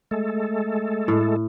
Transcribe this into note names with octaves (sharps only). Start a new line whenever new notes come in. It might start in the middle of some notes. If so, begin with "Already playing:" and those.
G#3 A3 A4
A2